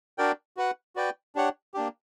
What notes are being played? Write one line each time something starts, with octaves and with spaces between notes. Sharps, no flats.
D4 F#4 A#4 D5 G5
F#4 B4 F#5
F#4 B4 D5 G5
D4 G4 C#5 F#5
A#3 D4 G4